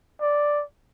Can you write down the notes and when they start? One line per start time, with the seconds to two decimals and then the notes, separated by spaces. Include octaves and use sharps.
0.21 D5